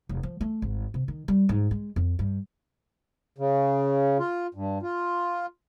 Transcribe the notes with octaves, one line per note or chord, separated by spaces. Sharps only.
F1
F3
A3
G#1
C3
D#3
G3
G#2
G#3
F2
G2
C#3
F4
G2
F4